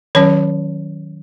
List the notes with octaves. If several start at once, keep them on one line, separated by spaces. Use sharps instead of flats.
D#3 F#3 C#4 C#5